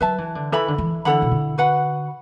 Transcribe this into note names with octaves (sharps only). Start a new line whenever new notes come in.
F#3 B4 E5 A5
E3
D3
E3 A4 E5 B5
D3
E3
D3 E4 A4 F#5 B5
B2
D3
F#4 B4 F#5 B5